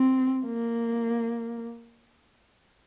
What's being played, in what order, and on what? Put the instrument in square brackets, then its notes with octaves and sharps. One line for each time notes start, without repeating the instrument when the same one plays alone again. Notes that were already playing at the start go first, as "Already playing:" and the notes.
Already playing: [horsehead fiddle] C4
A#3